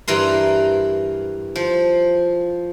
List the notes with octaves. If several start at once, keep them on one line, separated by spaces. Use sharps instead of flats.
G2 E3 A#4 C6
F3